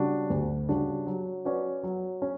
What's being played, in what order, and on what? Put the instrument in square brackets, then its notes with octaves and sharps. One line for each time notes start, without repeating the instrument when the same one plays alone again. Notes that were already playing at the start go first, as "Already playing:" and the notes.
Already playing: [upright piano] C#3 G3 D4 F#4
D2
C#3 G3 D4 F#4
F#3
C#4 F#4 B4 D5
F#3
C#4